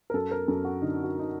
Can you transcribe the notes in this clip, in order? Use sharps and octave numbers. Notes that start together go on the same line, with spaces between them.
A#4
F#2 A4
A#4
F#2 A4
F#4
D3 D#4
F#4
D#4